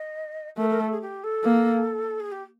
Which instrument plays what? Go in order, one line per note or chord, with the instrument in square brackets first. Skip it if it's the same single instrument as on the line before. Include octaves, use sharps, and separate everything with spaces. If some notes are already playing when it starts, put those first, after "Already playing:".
Already playing: [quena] D#5
[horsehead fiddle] A3 [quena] A#4
[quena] A#4
A4
G#4
G4
A4
[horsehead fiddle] A#3
[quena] G#4
G4